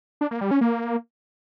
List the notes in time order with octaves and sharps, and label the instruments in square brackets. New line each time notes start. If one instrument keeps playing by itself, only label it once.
[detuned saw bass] D4
A#3
G3
C#4
A#3